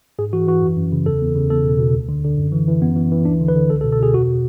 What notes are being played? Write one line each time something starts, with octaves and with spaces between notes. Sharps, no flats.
G#2 G#4
E3 F#4
E3 F#4
F#2
F#2
C#3
E2 A4
E2
C#3
E2 A4
B2
B2
D2
D3
D3
F#2
E3
E3
F#2 B3
E3
E3
D2 D4
D3
B4
D3
C#2 A4
A4
B2
A4
B2 G#4
E2 F#4